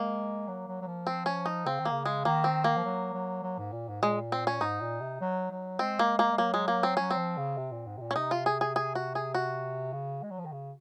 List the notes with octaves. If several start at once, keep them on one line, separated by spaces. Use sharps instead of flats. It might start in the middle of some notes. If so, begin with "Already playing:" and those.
Already playing: G#3 A#3
F#3
F#3
F#3
F3
C4
C#4
D#4
C#3 C4
D#3
A#3
C#3
G#3
D#3 A#3
C4
A#3
F3
F#3
F#3
F#3
G#2
A#2
G#2
A#2 G#3
C4
C#4
G#2 D#4
A#2
C3
F#3
F#3
G#3 C4
A#3
A#3
G#3
F#3 A#3
G#3
A#3
C4
F#3 C#4
C4
F3
C#3
C3
A#2
G#2
C3
A#2
C#4
C3 D#4
F4
G#4
G#4
G#4
F#4
G#4
F#4
C#3
G#3
F#3
F3
D#3
C#3